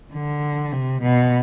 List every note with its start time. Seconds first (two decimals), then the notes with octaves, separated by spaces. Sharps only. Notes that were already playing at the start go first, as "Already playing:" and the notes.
0.13 D3
0.72 C3
1.02 B2